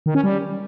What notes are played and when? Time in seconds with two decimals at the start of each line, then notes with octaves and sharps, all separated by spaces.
0.06 D#3
0.15 C#4
0.24 G3